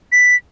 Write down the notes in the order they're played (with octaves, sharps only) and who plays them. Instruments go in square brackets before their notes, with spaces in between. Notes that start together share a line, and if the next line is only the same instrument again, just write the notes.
[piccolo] B6